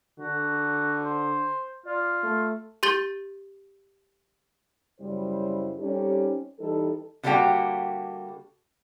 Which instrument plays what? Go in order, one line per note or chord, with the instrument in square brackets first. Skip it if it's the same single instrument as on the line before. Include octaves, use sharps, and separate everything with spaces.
[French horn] D3 [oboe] F#4
[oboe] C5
[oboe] F4 [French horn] D5
[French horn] A3
[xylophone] G4 C6 G6 A6 G7
[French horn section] F#2 C#3 F#3 G3 E4 C5
G3 C4 C#4 D#4 G4 A4
E3 G3 D#4 A4
[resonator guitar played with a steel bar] D3 G3 A#3 F#4 G4 G5